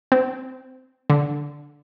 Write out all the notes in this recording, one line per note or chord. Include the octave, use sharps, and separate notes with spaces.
C4
D3